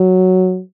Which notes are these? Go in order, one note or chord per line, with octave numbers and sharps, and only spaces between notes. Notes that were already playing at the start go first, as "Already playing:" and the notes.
Already playing: F#3